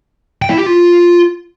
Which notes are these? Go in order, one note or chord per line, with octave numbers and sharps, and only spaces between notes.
G5
E4
G4
F4